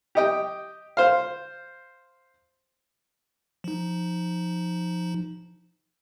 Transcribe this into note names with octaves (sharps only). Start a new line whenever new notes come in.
G4 D#5 G5
C5 F5
F3 D#4